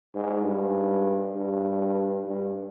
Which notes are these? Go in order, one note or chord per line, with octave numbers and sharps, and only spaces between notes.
G#2
G2
G2
G2